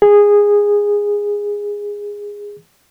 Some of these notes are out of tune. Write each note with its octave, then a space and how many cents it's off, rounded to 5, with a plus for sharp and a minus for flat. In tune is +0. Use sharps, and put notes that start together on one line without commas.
G#4 -15